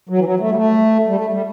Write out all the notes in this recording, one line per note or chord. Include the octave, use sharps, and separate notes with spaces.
F#3
E3
F#3
A3
G3
A3
G3
A3
G3